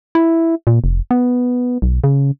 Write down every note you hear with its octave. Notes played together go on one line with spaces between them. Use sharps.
E4
A#2
F1
B3
B1
C#3